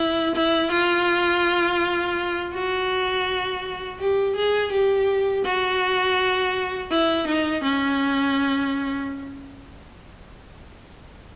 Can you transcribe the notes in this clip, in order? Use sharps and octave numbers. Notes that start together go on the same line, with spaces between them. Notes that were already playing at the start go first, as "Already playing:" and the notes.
Already playing: E4
E4
F4
F#4
G4
G#4
G4
F#4
E4
D#4
C#4